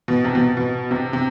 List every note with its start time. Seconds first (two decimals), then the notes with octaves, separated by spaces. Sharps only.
0.08 B2
0.24 C3
0.35 B2
0.57 B2
0.91 C3
1.13 C3